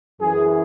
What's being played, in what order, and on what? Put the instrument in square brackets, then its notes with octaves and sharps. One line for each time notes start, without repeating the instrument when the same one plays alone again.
[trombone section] F#2 E3 G#4